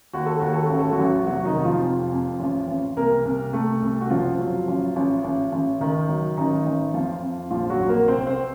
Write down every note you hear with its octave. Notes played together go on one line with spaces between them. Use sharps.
D#2 F#4
A4
D#2 F#4
A4
A1 F#4
A4
F#3 F#4
A1
F1 F#3 F#4
D#3 D#4
F1
F3 F4
F2
F2
A1
A1
C2 A#3 A#4
C2
C2 A3 A4
C2
F#4
F#1 F3 F4
F#3
A1
A1
A1
A1
C#2 D#3 D#4
F#3
A1 D#3 D#4
A1
F2 F3 F4
F2
A#1 F3 F4
F#3 F#4
A#1
A#3 A#4
C2 C4 C5
C4 C5